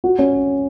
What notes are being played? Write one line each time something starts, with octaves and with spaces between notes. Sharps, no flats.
F#4
C#4